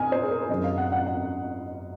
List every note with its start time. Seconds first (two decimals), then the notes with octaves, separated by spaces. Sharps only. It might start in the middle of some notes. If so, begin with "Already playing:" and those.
Already playing: F2 G#5 D#6 F6
0.12 C5
0.23 G#4
0.31 A#4
0.49 F#2 D#3 F#3 D#5
0.64 F5
0.78 F#5
0.92 F#5
1.07 F#5